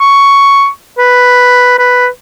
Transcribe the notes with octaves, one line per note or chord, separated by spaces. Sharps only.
C#6
B4
B4